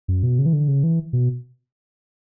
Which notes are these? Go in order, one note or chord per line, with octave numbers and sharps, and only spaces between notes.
F#2
B2
C#3
E3
D3
C#3
E3
B2